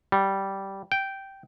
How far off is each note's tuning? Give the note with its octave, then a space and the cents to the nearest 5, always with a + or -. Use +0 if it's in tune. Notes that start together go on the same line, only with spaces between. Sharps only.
G3 -10
G5 -10